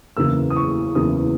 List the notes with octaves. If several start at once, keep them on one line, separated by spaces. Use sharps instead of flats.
F#1 E2 C#3 E3 A#3 E6
D#6
C#6
F#1 E2 C#3 E3 A#3 D#6